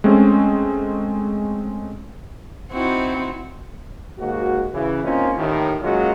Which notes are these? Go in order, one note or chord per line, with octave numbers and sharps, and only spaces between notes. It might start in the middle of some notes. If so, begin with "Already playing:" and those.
G#3 A3 C4 C#4
C4 D#4 E4 F#4
D#2 G#2 A#3 F#4
C#3 E3
A#3 C4 C#4 D#4 F4
D#2 A2 D#3
F#3 G#3 A#3 C#4 F4 F#4